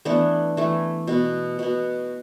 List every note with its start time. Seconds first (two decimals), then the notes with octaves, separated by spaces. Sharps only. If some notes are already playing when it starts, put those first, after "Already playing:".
0.05 E3 A3 B3 D4
0.57 E3 A3
1.07 B2 B3
1.59 B2 B3